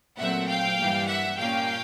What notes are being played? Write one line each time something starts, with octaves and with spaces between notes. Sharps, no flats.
A#2 F#3 A3 C4 E5 F#5
F5 G5
G2 E3 G3 A#3
E5 F#5
A#2 G3 A#3 C#4 F5 G5